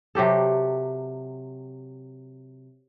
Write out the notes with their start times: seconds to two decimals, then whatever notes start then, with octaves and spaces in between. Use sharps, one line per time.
0.15 C3 F#3 G4 A4